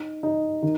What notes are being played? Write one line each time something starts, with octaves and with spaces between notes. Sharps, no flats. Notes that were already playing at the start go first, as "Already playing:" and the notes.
Already playing: D#4
D#4
D#3